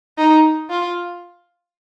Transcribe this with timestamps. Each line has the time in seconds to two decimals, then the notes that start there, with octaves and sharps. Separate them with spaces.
0.18 D#4
0.70 F4